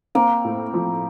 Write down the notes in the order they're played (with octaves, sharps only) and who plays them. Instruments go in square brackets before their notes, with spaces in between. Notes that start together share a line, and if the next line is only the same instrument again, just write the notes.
[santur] A#3 [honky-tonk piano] C4
[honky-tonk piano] A2
F3